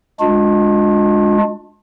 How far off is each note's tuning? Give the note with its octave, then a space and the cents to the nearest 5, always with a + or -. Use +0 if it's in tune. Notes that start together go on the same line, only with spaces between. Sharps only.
G#3 +0 D4 +0 F4 +40